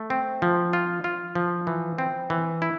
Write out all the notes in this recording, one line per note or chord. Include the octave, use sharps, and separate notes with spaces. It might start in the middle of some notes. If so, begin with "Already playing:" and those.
Already playing: A3
C4
F3
F4
F4
F3
E3
C4
E3
E4